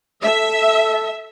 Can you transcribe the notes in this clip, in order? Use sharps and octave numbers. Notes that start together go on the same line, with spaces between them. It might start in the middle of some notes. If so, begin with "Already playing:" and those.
A4 E5